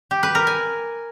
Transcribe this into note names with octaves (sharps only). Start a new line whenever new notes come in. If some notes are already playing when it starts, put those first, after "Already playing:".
G4
B4
A#4
G#5